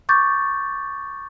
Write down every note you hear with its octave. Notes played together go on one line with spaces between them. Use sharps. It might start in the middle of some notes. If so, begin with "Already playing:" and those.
C#6 D6 G6 A6